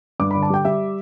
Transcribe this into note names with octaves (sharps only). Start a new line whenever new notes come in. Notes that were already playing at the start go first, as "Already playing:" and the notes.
G2 D6
D3 B5
A5
G3 G5
G3 E5